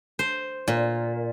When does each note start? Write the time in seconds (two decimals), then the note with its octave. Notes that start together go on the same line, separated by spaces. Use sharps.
0.19 C5
0.68 A#2